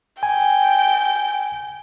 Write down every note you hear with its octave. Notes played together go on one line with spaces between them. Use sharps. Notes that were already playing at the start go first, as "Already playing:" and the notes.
G5 G#5